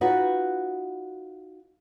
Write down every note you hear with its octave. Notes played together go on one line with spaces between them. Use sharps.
D#4 F4 F#4 B4